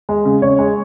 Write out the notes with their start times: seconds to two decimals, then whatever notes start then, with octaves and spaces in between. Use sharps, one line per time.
0.09 G#3
0.25 C#3
0.42 C#3 C#5
0.59 G#3